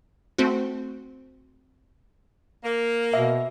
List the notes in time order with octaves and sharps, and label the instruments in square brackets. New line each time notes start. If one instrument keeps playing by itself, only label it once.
[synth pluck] A3 C4 F#4
[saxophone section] A#3
[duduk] B2 [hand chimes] E5